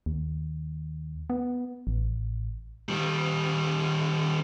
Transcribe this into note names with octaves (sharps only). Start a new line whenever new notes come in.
D#2
B3
A1
D#3 G3